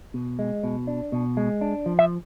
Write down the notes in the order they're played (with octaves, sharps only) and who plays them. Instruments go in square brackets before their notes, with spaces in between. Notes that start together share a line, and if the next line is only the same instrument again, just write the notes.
[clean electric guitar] B2
G#3
B2
D4
B2
G#3
D4
F3
E5